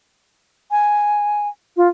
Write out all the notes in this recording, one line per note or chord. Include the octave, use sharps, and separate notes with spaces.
G#5
F4